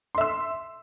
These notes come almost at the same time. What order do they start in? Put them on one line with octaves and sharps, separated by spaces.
C6 E5 E6